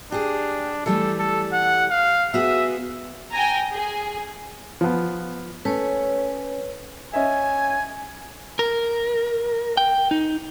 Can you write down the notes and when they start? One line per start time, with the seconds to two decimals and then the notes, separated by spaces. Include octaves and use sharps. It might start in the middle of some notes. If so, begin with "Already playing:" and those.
0.12 D4 G4 G#4
0.86 E3 G3 A3 A4
1.19 A4
1.53 F#5
1.91 F5
2.34 B3 F#4 G#4 E5
3.32 G5 G#5 A#5
3.72 G#4
4.81 F3 B3
5.65 A3 C#4 B4 C#5
7.14 C#4 D#5 E5 G#5
8.59 A#4
9.77 G5
10.11 D#4